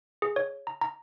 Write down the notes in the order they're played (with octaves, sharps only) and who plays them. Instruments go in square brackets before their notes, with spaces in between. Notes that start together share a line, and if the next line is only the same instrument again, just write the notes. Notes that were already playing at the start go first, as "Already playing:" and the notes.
[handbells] G#4
C#5
A#5
A#5